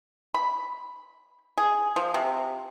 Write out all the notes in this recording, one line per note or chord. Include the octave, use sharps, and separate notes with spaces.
B5
G#4
F3
C3